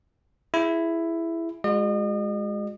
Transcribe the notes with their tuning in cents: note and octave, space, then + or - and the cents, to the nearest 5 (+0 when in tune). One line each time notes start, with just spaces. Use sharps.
E4 +10 G#4 +0
G#3 +0 F#4 -40 D#5 -40